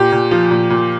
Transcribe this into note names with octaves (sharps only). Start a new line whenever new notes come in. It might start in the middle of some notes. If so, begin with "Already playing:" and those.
Already playing: A#2 G4
A#2
F3
A#2
A#2